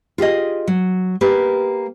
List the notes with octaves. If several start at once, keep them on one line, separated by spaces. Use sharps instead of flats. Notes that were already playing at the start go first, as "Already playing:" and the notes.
F4 G4 G#4 D#5
F#3
A#3 G4 B4